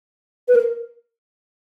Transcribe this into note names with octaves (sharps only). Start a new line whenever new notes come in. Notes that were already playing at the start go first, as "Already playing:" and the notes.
B4
A#4